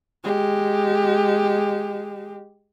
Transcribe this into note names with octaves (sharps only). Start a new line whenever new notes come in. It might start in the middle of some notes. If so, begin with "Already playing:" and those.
G#3 G4